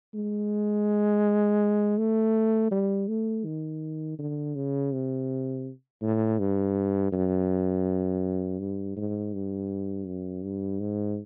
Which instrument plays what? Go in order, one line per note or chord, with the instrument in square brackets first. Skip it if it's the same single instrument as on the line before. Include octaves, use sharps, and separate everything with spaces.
[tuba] G#3
A3
G3
A3
D#3
D3
C#3
C3
A2
G2
F#2
G2
G#2
G2
F#2
G2
G#2